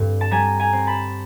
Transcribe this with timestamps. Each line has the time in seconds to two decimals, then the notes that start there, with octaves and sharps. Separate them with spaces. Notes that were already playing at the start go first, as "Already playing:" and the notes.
Already playing: G2 D3 C4
0.21 A5
0.31 G3 G#5 A#5
0.60 G#5 A#5
0.73 C4
0.87 A5 B5